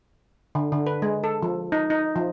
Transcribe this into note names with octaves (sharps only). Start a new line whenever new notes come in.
D3
D3
B4
G#3
A4
F3
D#4
D#4
F3